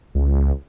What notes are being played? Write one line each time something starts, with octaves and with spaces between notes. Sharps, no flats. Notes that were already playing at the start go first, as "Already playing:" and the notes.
C#2